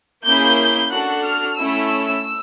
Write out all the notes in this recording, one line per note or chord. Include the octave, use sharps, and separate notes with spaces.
A#3 C#4 E4 G#4 G6
D4 F#4 A4 F#6
F6
A3 C#4 E4 E6